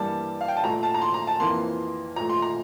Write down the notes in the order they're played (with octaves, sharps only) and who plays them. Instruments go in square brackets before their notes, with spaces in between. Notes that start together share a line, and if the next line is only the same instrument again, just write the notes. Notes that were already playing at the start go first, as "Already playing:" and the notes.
Already playing: [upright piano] G2 E3 G3 A#3 A5
F5
G5
A5
A#2 A3 A#5
A5
A#5
C6
A#5
A5
F2 E3 A#3 C6
A#2 F3 A3 A#5
C6
A#5